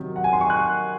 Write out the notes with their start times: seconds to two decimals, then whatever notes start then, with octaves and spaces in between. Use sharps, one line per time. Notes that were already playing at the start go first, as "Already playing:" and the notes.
Already playing: C3 D#3 F#3
0.16 F#5
0.24 G#5
0.33 C6
0.41 C#6
0.50 F#6